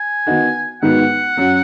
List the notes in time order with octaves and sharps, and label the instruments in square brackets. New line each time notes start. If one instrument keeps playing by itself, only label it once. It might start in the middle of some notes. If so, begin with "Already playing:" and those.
Already playing: [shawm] G#5
[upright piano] D#3 B3 D#4 F#4
[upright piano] G#2 D#3 B3 F#4 [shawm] F#5
[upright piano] F#2 F#3 C#4 F#4